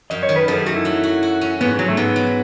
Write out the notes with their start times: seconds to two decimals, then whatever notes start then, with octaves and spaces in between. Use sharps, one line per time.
0.10 F#2 D#5
0.23 C#5
0.29 D#3
0.36 B4
0.48 F#2 A4
0.57 G#4
0.66 A3 F#4
0.76 E4
0.85 F#3
1.04 F#4
1.23 F#4
1.41 C#4
1.61 G#2 B3
1.79 G#2 F#3
1.88 A3
1.97 G#2 B3
2.16 F#3